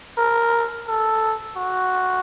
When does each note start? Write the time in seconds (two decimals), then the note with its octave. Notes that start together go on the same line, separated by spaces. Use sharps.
0.18 A#4
0.88 A4
1.57 F#4